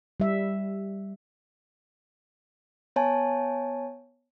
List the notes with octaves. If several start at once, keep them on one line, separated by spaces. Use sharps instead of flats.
G3 E5
B3 C#5 G#5 A5